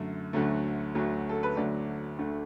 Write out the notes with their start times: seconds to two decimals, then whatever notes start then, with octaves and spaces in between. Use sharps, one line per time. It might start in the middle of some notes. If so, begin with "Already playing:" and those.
Already playing: F#2 D3 A3
0.33 D2 D3 F#3 A3
0.95 D2 D3 F#3 A3
1.29 A4
1.43 B4
1.57 D2 D3 F#3 A3 D5
2.19 D2 D3 A3